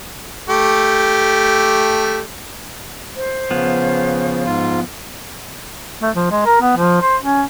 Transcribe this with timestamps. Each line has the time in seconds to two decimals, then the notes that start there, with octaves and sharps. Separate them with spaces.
0.49 A3 G4
3.16 C5
3.51 C#3 F3 B3
4.45 G#2 F4
6.02 A3
6.15 F3
6.31 G#3
6.45 A#4
6.61 B3
6.77 F3
7.02 C5
7.22 C#4